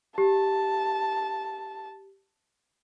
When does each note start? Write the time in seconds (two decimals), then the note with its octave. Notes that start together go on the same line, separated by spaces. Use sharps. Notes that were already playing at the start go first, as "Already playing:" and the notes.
0.18 G4 A5